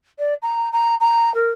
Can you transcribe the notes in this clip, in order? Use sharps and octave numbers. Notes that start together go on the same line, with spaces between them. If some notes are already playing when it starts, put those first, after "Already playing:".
D5
A#5
A#5
A#5
A#4